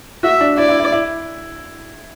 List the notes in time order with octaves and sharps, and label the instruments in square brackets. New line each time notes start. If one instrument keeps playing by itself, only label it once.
[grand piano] F#4 [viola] E5
[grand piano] D4
[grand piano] E4 [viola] D5
[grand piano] E4
E4
E4